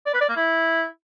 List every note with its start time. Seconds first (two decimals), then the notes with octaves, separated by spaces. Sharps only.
0.06 D5
0.14 B4
0.21 D5
0.29 A#3
0.36 E4